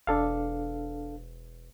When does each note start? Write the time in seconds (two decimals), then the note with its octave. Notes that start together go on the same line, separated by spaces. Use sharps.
0.07 E1 D4 A4 F5